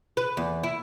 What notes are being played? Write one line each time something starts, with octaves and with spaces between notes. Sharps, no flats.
B4
E2
E4